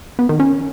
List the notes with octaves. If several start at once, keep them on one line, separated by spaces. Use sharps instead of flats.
B3
D#3
C#4